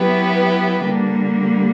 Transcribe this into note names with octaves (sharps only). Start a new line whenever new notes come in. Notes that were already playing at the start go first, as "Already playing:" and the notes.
Already playing: F#3 B3 E4 G4 B4
D3 G3 A#3